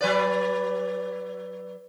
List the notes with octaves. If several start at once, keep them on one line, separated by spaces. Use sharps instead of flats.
F#3 B4 D5